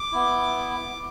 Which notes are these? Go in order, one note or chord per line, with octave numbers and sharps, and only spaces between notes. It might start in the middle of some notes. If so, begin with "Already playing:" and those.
Already playing: D6
B3 E4